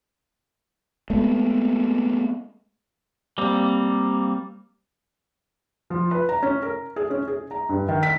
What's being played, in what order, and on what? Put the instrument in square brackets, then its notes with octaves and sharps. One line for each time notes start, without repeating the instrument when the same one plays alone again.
[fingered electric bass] G#3 A3 B3
[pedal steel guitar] G3 A#3 C4
[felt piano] F3
B4
A#5
C#4
A#4
G#4
C#4
G#4
A#5
G2
D#3
B6